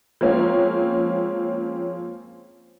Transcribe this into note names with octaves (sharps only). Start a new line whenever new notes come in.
F3 G#3 A#3 C4 C#4